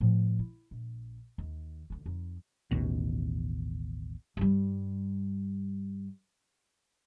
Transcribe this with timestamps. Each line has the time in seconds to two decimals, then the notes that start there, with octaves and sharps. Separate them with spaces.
0.01 A2 F3
0.39 E4
0.71 A#1
1.38 D#2
1.90 D2 C#3
2.06 F2 D#4
2.71 A1 D#2 B2
4.37 G2 G3